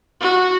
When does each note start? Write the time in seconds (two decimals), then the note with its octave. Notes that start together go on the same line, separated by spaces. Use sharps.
0.21 F#4